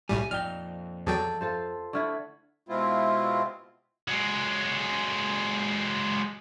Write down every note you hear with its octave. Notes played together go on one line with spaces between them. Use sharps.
B1 A2 G3 G#5
F2 A#2 D#4 D5 G5 F6 G7
E2 F#3 G#4 A4 D5 G5 A5
F4 A4 C5
D3 A3 E4 C#6 F6 G#6
B2 G#3 C4 E4 F4
F#3 G#3